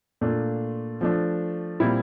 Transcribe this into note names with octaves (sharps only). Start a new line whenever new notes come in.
A#2 A3 D4 F4
F3 A3 D4
A#2 G3 C4 E4